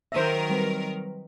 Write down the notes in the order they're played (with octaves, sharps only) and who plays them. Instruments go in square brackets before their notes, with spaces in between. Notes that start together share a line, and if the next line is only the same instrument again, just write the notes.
[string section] D#3 F#3 A#4 [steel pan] C5 E5 [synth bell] A#6 D#7 E7
[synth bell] G3 C4 B4